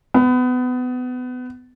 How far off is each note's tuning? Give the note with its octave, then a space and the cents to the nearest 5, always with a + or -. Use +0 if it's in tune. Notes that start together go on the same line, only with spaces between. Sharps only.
B3 +25